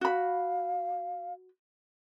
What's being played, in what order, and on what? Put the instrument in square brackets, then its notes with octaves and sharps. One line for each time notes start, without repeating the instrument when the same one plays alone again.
[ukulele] F#4 B5 [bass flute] F5